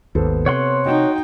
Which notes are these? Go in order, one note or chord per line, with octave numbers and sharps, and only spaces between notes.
G#1 D#2 B3 A4 C5
C3 C#5 F#5 C6
D#4 F#4 D#5 G5